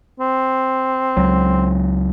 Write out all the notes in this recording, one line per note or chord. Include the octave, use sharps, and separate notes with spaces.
C4
C#2 F#3